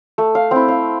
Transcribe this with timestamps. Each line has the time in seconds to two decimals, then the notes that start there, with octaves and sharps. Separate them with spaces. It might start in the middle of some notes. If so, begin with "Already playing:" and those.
0.18 A3
0.35 F5
0.51 C4 E4 G5
0.68 F5